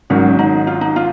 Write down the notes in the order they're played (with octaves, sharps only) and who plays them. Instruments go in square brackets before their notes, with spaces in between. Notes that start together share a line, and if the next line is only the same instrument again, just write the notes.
[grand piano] G#1 G#2 D#3 F#3 [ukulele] C#4
[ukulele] D#4
F4
D#4
F4